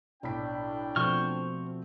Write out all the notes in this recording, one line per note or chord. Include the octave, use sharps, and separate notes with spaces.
B1 A2 D4 D5 G5 B6
B2 F3 A3 C4 F#4 C5 C#6 F6